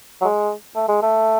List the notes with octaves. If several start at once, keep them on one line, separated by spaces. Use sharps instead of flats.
F#3
G#3
A3
G#3
A3